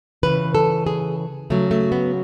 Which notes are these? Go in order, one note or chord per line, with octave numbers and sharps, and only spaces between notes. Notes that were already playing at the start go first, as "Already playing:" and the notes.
C#3 E3 B4
A4
G#4
C#3 F#3 A3
A3
B3